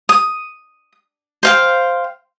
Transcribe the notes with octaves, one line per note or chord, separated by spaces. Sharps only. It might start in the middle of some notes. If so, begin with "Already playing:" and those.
D#6
C5 F5 G5